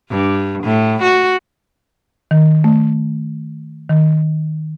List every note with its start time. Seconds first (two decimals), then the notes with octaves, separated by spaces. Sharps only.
0.10 G2
0.64 A2
1.03 F#4
2.31 D#3
2.64 A3
3.89 D#3